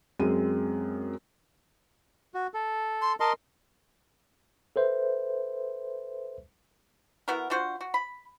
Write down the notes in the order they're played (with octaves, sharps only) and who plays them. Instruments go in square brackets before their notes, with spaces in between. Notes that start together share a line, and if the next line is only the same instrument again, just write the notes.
[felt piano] F#2 G#3 C4 D#7
[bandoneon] F#4
A4
[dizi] C6
[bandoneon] A#4 D#5 C6 [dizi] A5
[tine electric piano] A4 B4 C5 E5
[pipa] B3 E4 F#4 A#4
D4 F4 F#4 C5
F#4
B5